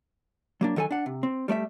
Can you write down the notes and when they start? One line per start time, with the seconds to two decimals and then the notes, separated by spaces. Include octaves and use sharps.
0.61 F#3 A#3 D4
0.76 D#3 F#3 A4 D5 G#5
0.91 D4 F#5
1.06 C3
1.23 C4
1.48 G3 A3 D5 E5